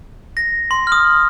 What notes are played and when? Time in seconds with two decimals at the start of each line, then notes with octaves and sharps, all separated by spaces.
0.37 A#6
0.71 C6
0.87 F6
0.92 D#6